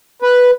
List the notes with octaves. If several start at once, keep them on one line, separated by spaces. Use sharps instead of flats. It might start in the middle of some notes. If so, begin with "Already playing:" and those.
B4